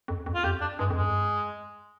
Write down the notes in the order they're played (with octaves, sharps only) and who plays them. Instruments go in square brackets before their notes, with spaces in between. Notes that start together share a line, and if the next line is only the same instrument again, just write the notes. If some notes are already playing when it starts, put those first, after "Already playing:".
[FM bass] F2
F2
[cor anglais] F4
[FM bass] F2 [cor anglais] G4
[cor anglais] D4
[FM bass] G2 [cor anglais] G#3
[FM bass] F2
[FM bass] G2 [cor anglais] G#3